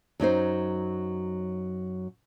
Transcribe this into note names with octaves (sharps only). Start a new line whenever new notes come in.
F#2 F#3 D#4 C5